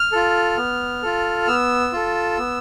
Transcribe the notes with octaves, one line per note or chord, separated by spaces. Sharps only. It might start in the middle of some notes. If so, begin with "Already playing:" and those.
Already playing: F6
F4 A4
B3
F4 A4
B3 E6
F4 A4
B3